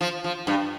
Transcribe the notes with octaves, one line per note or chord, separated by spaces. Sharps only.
F3
F3
G2